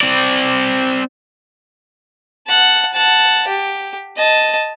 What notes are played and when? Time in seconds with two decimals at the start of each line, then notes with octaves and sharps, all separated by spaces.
0.01 C4 D5
2.47 F#5 A5
2.93 F#5 A5
3.47 G4
4.16 D#5 A5